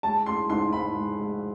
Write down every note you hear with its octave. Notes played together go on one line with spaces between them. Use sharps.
G#3 A5
G#3 C6
G#2 C6
G#2 B5
G#3
G#3